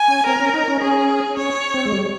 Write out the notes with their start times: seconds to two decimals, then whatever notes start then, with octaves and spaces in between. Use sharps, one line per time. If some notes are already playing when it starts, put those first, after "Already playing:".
Already playing: G#5
0.08 C#4
0.26 C4 A#4
0.40 C#4
0.54 D#4
0.68 C#4
0.81 C#4 G#4
1.37 C#4 C#5
1.74 C4
1.85 G#3
1.93 G3